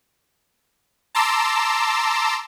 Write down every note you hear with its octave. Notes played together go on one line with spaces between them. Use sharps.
A5 A#5 C6 D6 E6